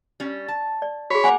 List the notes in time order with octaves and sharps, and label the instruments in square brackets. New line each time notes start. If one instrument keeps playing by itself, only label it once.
[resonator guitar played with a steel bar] G3 C#4
A5
[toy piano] D5
[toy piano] F#4 G#4 [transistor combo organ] C#5 B5
[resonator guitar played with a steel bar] A#3 F#5 A#5 [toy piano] G#5 D6